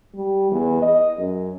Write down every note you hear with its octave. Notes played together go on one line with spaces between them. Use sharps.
G3
E2
D#5
F#2